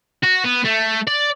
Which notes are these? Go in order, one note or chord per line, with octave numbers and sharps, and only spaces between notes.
F#4
B3
A3
D5